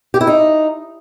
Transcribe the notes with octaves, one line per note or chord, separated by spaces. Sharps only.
G4
E4
D#4